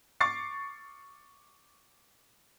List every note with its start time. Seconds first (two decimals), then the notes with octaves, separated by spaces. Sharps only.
0.20 C#6 D6 A6 C7